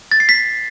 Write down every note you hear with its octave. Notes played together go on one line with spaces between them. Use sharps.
A6
C7
B6